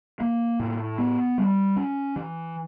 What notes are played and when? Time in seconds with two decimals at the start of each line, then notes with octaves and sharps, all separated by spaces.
0.20 A#3
0.60 A2
0.98 B3
1.38 G3
1.76 C#4
2.16 E3